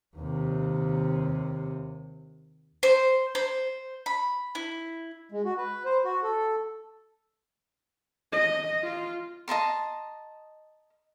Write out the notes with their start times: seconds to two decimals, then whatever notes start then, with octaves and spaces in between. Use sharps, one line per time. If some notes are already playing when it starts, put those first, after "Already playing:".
0.17 D#2 C3
2.83 C5
3.35 C5
4.06 B5
4.55 E4
5.32 G#3
5.45 F#4
5.58 B4
5.86 C5
6.05 F#4
6.23 A4
8.32 D#5
8.83 F4
9.48 D#5 A5 A#5 C6